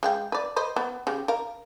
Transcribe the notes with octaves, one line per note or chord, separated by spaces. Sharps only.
G#3 F5 G5
B4 D5
B4 C5 D#5
B3
C#3 G4
A#4 F5